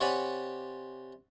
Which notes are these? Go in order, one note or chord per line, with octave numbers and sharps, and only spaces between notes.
C3 C#5 D5 F#5 G#5 B5